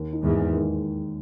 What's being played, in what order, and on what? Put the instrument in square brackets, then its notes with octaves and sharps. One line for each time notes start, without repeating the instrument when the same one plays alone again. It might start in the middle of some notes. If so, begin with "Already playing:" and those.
Already playing: [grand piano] D#2
D#4
[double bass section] E2 G#2
[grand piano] G#3
D#3